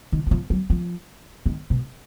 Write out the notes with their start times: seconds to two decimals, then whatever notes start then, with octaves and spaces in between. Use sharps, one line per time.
0.12 D#3
0.27 F#3
0.31 F3
0.50 F#3
0.70 F3
1.46 D#3
1.70 B2